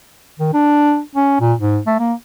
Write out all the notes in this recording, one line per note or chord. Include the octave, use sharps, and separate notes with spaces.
D#3
D4
C#4
A#2
G#2
A3
A#3